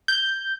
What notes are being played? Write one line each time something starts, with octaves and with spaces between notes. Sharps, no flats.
G6